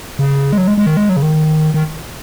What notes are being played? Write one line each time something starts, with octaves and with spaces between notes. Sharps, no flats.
C#3
G#3
F#3
G#3
G#3
D#3
G#3
F#3
C#3
D#3
D#3